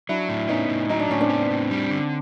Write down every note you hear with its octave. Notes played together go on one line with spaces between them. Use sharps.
F#3 D4 E4
A2
B3 C#4 D#4
A2
F#3 D#4
D4
A2 C#4
C4 D4
B3
A2
G3
D3